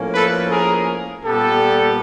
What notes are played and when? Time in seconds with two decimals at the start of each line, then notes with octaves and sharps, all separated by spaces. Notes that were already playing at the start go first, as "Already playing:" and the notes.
Already playing: A2 F3 A#3 C#4
0.13 A4 B4
0.50 G#4 A#4
1.24 A#2 G3 B3 G4 A4